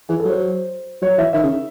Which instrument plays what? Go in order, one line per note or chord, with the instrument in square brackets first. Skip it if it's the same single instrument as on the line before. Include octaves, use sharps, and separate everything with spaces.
[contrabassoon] E3 [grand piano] G#4
[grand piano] A4
[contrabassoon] F#3 [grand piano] C5
[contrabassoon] F#3 [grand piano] C#5
[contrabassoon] E3 [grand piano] E5
[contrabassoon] D#3 [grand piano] E5
[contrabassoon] C#3